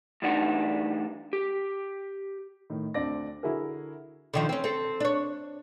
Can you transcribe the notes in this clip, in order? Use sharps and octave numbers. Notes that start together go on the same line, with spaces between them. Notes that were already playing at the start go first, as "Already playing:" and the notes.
A2 E3 G3 D4 D#4 F#5
G4
A2 D#3
D2 C4 D4 D5 A#6
D3 E4 F#4 G#4 A#4
D3 D#3 F3
C4 C#4
C4 A4
D4 C#5